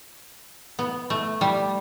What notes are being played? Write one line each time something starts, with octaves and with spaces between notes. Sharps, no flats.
B3
A3
G3